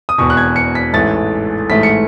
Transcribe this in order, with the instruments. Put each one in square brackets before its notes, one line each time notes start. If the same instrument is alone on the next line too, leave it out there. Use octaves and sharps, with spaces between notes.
[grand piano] D#6
E1 E2 B2 C#6
F#6
G#6
C#7
B6
A1 G#2 E3 A3 A6
A1 G#2 E3 A3 B6
C#7